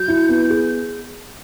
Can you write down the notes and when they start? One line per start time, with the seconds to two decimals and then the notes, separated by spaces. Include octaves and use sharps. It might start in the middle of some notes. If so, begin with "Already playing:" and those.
Already playing: F#3 G6
0.08 E4
0.29 B3
0.50 G#4